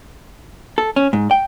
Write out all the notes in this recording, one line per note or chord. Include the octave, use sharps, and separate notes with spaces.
A4
C#4
G#2
G5